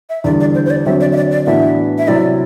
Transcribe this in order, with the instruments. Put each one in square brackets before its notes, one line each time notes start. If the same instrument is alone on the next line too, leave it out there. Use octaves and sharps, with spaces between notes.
[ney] E5
[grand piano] E2 D3 G3 [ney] D5
[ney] D5
C5
C5
D5
[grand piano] D3 F#3 C4 [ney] E5
[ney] D5
E5
D5
D5
[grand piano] A2 E3 B3 D4 F#4 [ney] E5
[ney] E5
[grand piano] C3 F#3 C4 E4 [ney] D5